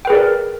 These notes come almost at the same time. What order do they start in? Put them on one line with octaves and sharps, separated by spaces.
G5 B4 G#4 D5 A#4